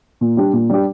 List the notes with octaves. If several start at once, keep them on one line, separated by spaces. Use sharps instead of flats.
A#2
G3 D4 G4
A#2
G3 D4 G4